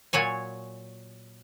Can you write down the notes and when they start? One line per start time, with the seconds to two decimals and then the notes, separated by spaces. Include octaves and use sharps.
0.13 A#2 F#3 C#5 G#5